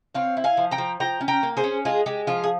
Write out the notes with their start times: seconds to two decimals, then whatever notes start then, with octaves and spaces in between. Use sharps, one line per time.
0.15 C4 C#5 F5
0.37 E4
0.44 F5 G#5
0.57 F3
0.71 G5 A#5
0.78 F3
1.00 F3 G5 A#5
1.21 C#4
1.28 G5 A#5
1.43 A#3
1.57 G#4 C5
1.64 C#4
1.85 G#3 F4 G#4
2.06 G#3 G4
2.27 F3 F4
2.44 G#4